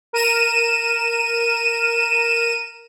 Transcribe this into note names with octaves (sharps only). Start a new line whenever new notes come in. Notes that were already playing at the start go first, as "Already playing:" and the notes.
A#4 D#7 E7